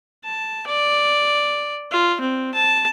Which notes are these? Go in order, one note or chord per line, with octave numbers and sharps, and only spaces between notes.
A5
D5
F4
C4
A5